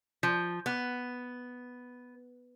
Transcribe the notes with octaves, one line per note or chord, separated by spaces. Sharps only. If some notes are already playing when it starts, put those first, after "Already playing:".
F3
B3